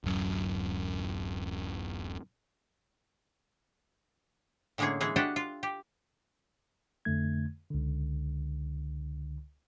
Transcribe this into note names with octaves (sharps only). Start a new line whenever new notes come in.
D1 F#2
A2 D3 G#3 A#3 C#4 G#4
E3 G#3 D#4 G#4
D4 E4 F#4 G4 A4 D#5
F4
G4
F2 D3 A3 G#6
C#2 D3